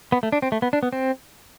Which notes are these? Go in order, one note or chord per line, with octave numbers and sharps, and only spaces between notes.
B3
A3
D4
C4
A3
B3
D4
B3
C4